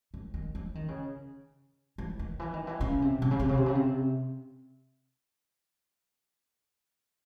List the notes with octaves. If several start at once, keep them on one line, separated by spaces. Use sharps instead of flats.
D#3
D#3
E3
D#3
C#3
E3
D#3
E3
D#3
E3
C#3
C3
C3
C#3
C3
C#3
C3
C#3
C3